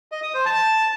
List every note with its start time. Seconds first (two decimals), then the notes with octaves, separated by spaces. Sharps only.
0.12 D#5
0.23 D#6
0.34 C5
0.45 A5